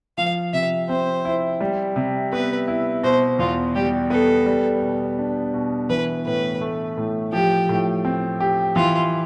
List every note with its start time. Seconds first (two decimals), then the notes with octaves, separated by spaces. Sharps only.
0.18 F3 F5
0.53 C3 E5
0.89 C4 C5
1.25 E4
1.61 G3
1.96 C3
2.33 B3 B4
2.68 E4
3.03 B2 C5
3.39 E2 F4
3.75 G3 G4
4.10 B3 A4
4.46 G3
4.82 B2
5.19 D4
5.54 B2
5.89 E3 B4
6.25 A2 B4
6.61 A3
6.97 A2
7.32 F3 G4
7.69 A2
8.05 C4
8.40 G4
8.76 E3 F4